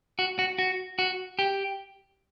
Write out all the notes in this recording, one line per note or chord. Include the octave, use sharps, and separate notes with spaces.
F#4
F#4
F#4
F#4
G4